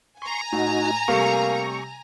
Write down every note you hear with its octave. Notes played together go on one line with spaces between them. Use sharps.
G#5 A#5 C6 C#6
A2 D#4 F#4
C3 G3 A3 A#3 C#6